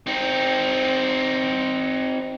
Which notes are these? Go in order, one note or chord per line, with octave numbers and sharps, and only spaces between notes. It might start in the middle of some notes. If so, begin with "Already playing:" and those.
C4 D#4